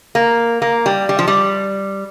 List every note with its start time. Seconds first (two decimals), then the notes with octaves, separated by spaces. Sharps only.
0.15 A#3
0.62 A#3
0.86 G3
1.09 G3
1.19 F3
1.28 G3